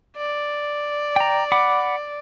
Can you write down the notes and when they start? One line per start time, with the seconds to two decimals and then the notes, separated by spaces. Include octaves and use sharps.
0.17 D5
1.16 G5 A#5
1.52 F#5 B5 D6